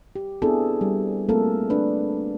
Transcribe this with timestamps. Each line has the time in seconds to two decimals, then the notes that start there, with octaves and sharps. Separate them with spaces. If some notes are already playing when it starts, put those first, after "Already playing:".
0.16 G4
0.42 B3 C4 D4 E4 G#4 A4
0.81 G3
1.29 A3 A#3 C4 F4 A4 A#4
1.70 D4 B4